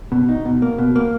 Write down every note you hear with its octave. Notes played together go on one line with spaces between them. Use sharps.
B2
D#4
B2
A#3
B2
A#3